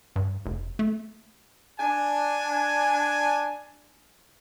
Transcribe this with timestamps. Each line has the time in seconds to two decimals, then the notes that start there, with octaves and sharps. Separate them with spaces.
0.16 G2
0.46 F1
0.79 A3
1.79 D4 G#5